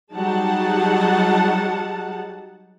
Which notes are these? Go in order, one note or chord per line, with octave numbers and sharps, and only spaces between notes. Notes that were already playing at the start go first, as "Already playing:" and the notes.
F#3 G3 D#4 G#4 F#5 A5